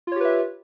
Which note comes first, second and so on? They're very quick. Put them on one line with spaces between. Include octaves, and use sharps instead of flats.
F4 C#5 G4 B4 E5